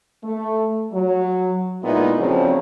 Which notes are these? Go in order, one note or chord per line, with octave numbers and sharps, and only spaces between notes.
A3
F#3
A#2 G#3 B3 D#4 E4
C#3 F3 F#3 A3 C4 D4